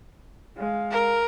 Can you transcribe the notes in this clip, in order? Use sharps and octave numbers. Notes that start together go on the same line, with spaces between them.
G#3 F5
A#4